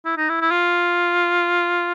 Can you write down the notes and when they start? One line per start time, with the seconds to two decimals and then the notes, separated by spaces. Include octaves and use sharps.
0.05 E4
0.17 D#4
0.29 E4
0.41 E4
0.51 F4